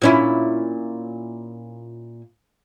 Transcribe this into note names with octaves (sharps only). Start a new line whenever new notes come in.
A#2 C#4 E4